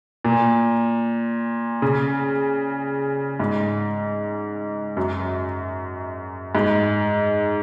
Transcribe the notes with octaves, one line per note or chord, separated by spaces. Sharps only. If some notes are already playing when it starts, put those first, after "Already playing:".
A#2
C#3
G#2
F#2
G#2